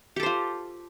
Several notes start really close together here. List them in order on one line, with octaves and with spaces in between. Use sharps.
G4 A4 C5 F4